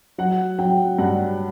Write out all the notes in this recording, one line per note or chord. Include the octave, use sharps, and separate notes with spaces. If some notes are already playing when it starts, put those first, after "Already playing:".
F#3 F#5
F#3 G5
G2 F#5